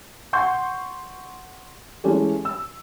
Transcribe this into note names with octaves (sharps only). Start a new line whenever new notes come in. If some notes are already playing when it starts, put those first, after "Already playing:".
F#5 C6 C#6 G6
E3 G#3 C#4 G4 A4
E6